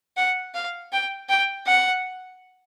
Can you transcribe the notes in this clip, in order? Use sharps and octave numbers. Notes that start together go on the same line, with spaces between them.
F#5
F5
G5
G5
F#5